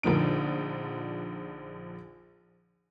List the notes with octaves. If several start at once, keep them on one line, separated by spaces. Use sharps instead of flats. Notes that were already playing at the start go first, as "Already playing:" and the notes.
A#1 D3 F3 D#4 D7